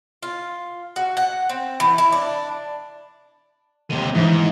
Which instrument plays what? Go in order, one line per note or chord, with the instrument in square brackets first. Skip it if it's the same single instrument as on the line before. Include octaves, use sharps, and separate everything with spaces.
[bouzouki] F4
F#4
F#5
C4
E3
E4
D4
[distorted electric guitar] D#2 C3 [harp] D#7
[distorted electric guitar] G#2 [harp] E3 D#4